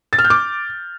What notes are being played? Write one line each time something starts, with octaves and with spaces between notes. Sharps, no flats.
A6
F6
G6
D6